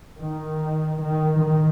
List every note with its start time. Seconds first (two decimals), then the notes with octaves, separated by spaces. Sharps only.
0.18 D#3
1.01 D#3
1.40 D#3